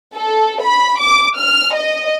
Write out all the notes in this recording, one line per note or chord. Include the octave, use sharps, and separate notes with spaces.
A4
B5
D6
F6
D#5